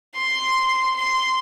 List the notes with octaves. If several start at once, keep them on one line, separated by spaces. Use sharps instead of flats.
C6
C6